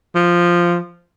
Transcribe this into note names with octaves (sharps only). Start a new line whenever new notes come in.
F3